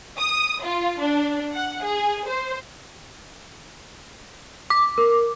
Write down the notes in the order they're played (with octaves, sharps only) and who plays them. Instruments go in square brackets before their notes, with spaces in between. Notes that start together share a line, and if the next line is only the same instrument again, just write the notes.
[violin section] D#6
F4
D4
F#5
G#4
C5
[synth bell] D6
[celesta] A#4